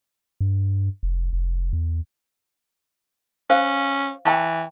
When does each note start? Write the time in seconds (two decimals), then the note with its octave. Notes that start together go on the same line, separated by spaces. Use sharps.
0.40 G2
1.03 F1
1.33 F1
1.73 E2
3.50 C#4 C5 F5
4.26 E3 G5 A5 C#6